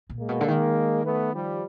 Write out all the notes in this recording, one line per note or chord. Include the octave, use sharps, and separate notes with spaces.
A#2
G#3 A#3
B2
D3
D#3
A3 B3
F3 G3